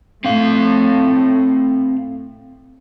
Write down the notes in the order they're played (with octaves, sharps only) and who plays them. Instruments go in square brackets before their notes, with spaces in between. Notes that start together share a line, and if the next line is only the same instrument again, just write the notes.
[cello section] A2 [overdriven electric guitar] C4 F5